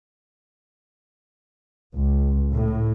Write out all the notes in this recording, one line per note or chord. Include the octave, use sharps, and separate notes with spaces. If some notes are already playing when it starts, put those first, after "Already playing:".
C#2
A2